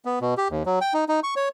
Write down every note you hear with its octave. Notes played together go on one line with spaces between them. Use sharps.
B3
B2
G4
D#2
F#3
G5
D#4
D#4
C#6
C#5